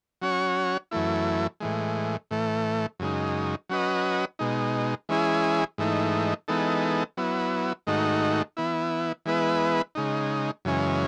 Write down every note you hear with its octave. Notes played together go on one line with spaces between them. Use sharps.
F#3 C#4 F#4 C#5
F#2 E3 A3 E4
A2 E3 G#3
A2 E3 A3
F#2 C#3 G#3 D#4
F#3 C#4 F#4 B4 D#5
B2 G#3 D#4
E3 G#3 C#4 E4 G#4
G#2 E3 A3 D#4
E3 G#3 B3 D#4 A4
F#3 B3 E4
G#2 D#3 A3 D#4 F#4
E3 B3 E4
E3 G#3 B3 E4 B4
C#3 G#3 D#4
F#2 C#3 E3 G#3 C#4